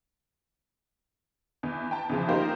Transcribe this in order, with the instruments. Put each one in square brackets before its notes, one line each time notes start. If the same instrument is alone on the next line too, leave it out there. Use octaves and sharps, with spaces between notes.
[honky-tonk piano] E2
G5 A5
E2 C#3 F3
A#3 D#4 F4 G4 A#4 C5